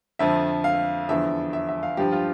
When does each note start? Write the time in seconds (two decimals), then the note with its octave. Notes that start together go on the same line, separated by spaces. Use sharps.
0.19 F2 D3 F3 E5
0.64 F5
1.09 E2 D3 F3 E5
1.53 E5
1.68 E5
1.83 F5
1.97 G2 F3 G4
2.12 F4